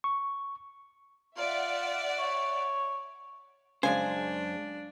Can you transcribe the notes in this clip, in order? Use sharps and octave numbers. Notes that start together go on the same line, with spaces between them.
C#6
F4 D5 E5 F#5
C#5
F#2 C#3 G#3 D4 C5 G#5